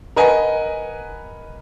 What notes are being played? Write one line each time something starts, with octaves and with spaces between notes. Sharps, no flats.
A#4 B4 D#5 F#5 G#5